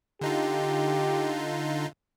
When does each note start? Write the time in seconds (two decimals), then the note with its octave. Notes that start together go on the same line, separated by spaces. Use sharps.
0.21 D3 D#4 F4 G4